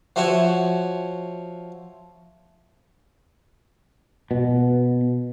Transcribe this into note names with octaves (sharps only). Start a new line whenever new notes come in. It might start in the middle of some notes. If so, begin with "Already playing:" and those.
F3 E4 F#4 C#5
B2